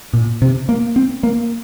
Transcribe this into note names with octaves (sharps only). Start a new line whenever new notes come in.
A#2
C3
A#3
C4
A#3